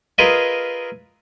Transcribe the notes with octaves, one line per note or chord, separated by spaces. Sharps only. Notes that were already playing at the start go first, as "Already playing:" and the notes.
F4 G#4 A#4 B4 D#5 E5